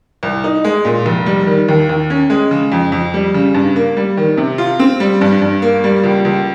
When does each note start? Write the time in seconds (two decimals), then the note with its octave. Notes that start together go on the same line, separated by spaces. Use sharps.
0.23 C2
0.44 D#4
0.64 G#3
0.85 A#2
1.06 F1
1.26 G3
1.47 D#3
1.68 D#2
1.89 D#2
2.10 C#4
2.30 G#3
2.51 C#3
2.72 F2
2.92 F2
3.14 G3
3.34 C#3
3.54 G2
3.76 A#3
3.97 G3
4.17 D#3
4.37 C3
4.58 F4
4.80 C4
5.00 G3
5.21 G2
5.41 G2
5.62 A#3
5.84 G3
6.03 C#2
6.25 C#2